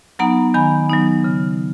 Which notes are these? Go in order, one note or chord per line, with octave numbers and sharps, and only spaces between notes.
F#3 B3 D#4 F#5 A#5
D#3 G#5 B5
F#3 B3 D#4
C#3